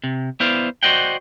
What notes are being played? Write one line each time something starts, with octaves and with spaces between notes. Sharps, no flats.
C3
B3 E4 C5 D5 F5
F#4 C5 D5 D#5 F#5 G5